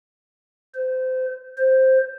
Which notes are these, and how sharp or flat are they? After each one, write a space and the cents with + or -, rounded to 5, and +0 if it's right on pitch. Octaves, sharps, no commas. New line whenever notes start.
C5 -25
C5 +5